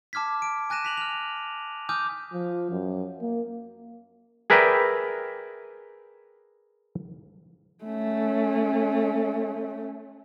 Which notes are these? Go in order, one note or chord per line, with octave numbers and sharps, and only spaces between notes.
A5 D6 F6 G#6 B6
D7
G#5 F#6 A#6 D#7 E7
B6 F7 F#7
F6 F7
G#5 D6 D#6 F6 G6
F3
F#2
A#3
G#4 A#4 B4 D5 E5 G5
A3 C#4